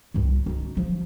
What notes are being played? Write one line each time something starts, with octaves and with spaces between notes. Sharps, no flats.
C2 G2
C#4 D#4
F3